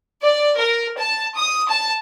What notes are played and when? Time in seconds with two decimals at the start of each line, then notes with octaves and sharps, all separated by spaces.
0.22 D5
0.56 A#4
0.97 A5
1.37 D#6
1.68 A5